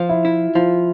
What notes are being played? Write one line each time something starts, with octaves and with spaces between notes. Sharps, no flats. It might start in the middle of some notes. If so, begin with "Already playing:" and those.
Already playing: F3 F4
E4
E4
F3 F4